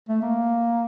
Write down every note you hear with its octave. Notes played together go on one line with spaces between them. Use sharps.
A3
A#3